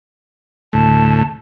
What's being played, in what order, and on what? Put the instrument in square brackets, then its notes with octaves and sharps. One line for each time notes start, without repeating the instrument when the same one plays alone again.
[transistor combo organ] D2 A2 [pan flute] A5